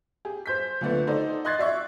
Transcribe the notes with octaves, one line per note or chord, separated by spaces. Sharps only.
G4 G#4
C5 G6 B6
C#2 A#2 D3 A3 B3
D#4 F#4 A4 C5 D5 D#5
D#5 C6 F#6 G#6 A6 C7
F#4 D5 E5 C#6